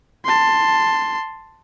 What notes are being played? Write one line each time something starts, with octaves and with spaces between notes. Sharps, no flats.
A5 C6